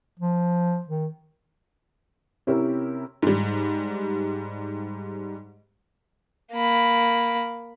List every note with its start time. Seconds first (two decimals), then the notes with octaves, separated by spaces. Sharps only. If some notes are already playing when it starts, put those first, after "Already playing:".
0.19 F3
0.88 D#3
2.47 C3 C#4 E4 G4 A#4
3.22 G#2 G3
6.53 A#3 B5